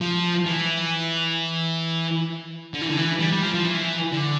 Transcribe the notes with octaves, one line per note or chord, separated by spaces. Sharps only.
F3
E3
D3
E3
D3
E3
G3
G3
F3
F3
E3
D3